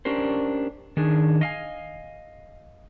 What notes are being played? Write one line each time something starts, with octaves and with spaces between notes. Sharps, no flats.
C#4 D4 G4 A#4 C5
D#3 D4 G#4
D#5 F5 G#5